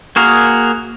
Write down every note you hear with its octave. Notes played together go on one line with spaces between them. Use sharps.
A#3 F#4 G#4 A#4